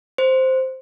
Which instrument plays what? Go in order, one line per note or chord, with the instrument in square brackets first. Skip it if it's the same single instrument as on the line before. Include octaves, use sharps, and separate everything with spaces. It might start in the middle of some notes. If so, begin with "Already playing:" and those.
[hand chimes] C5